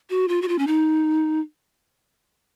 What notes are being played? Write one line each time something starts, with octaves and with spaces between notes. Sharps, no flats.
F#4
F4
F#4
F4
C#4
D#4